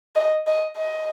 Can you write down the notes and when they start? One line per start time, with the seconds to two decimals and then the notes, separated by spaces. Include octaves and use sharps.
0.15 D#5
0.47 D#5
0.78 D#5